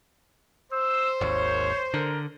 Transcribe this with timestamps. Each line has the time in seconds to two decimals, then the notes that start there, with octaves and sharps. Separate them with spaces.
0.72 C5 E6
1.21 G#1 D#2 C#5
1.94 D3 A#4